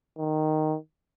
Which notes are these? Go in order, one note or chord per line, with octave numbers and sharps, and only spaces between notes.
D#3